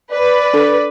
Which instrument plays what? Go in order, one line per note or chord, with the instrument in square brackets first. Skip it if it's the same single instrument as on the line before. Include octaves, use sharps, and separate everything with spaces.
[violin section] B4 [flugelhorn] D5
[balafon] D4 A4